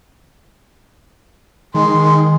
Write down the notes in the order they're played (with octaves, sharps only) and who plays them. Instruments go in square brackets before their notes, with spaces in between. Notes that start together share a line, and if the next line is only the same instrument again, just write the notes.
[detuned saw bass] D#3 [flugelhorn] G#3 [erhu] C6